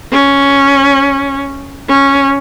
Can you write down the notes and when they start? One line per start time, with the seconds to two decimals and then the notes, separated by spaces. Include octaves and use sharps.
0.13 C#4
1.89 C#4